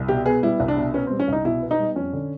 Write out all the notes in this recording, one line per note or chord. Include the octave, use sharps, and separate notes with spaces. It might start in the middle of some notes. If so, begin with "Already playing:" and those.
Already playing: C2
B2 G4
B3 G#4
G3 E4
C2
D4
B2
B3 C#4
C4
G3
C#4
C2 D#4
B2 E4
B3
D#4
G3
F2 C#4
D3